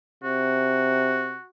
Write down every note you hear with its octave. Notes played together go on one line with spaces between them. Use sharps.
C3 F#4